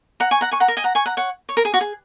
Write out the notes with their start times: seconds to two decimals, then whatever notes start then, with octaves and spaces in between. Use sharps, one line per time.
0.20 F#5 A#5
0.31 G#5 C#6
0.41 F#5 A#5
0.51 G#5 C#6
0.60 F#5 A#5
0.68 A#4
0.77 D#5 G#5
0.84 F#5 A#5
0.95 G#5 C#6
1.06 F#5 A#5
1.17 C#5 F#5
1.49 C#5
1.57 A#4
1.65 G#4
1.74 F#4
1.81 G#4